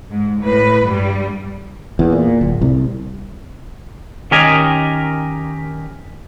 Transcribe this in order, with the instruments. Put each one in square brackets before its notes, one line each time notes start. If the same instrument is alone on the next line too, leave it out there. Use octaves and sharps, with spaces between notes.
[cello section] G#2
A2 B4
G2 G3
[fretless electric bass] E2
A#2
D1
C2
[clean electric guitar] D#3 C#4 G4 A#4 D#5 G#5